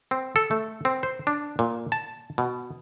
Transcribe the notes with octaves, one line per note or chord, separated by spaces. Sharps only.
C4
A4
A3
C4
C5
D4
A#2
A5
B2